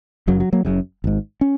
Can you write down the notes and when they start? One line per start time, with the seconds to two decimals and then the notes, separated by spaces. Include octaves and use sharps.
0.27 F#1 F#2 C#3 F#3
0.40 F#3
0.53 F#3 A#3
0.65 F#1 F#2 C#3
1.04 G#1 G#2
1.41 C#4